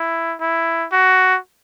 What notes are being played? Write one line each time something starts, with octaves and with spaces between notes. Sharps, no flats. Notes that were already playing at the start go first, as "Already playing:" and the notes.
Already playing: E4
E4
F#4